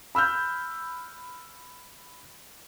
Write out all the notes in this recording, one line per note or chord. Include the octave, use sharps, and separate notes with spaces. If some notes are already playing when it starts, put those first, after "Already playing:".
B5 E6 F6 G6